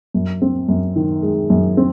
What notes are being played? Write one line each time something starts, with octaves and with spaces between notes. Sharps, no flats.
F#2
C4
F#2
D#3
G#3
F#2
C4